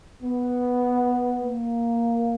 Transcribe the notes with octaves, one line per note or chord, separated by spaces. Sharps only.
B3
A#3